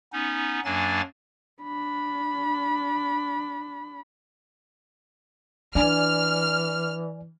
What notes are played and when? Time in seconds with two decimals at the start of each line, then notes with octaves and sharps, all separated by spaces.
0.13 B3 C#4 D#4
0.65 F#2 F#3 A#3 D4 G#5 A6
1.63 D4 B5
5.75 E3 D4 D5 G#5 F6